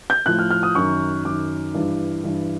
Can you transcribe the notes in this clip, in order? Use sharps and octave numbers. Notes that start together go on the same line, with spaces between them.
G6
A2 F3 F#6
F6
F6
D#6
F#2 D#3 C#6
F#2 D#3 D6
G2 E3
G2 E3